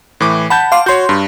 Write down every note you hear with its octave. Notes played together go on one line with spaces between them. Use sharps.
A2 E3 D6
F#5 A5 B5 G6
F5 C6 D6
F#4 C#5 C6 G6
G2